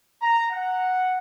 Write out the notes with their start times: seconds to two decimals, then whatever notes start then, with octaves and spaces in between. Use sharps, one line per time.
0.22 A#5
0.52 F#5